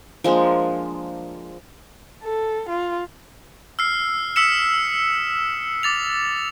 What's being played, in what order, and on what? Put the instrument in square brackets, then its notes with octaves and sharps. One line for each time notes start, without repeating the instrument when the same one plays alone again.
[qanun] F3 G#3 A#3 D4
[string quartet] A4
F4
[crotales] E6 F6 C7
D#6 E6 B6 C#7 E7
D6 A6 F7